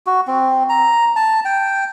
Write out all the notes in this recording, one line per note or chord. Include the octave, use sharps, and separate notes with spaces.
F#4
C4
A#5
A5
G5